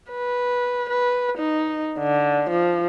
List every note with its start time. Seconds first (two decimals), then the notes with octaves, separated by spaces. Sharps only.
0.11 B4
0.90 B4
1.38 D#4
1.99 D3
2.50 F3